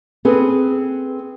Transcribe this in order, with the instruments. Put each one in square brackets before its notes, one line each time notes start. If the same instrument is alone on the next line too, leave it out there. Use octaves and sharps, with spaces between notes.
[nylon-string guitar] C4 G#4 A4 B4